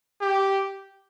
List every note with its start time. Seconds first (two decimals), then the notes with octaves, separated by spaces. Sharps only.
0.21 G4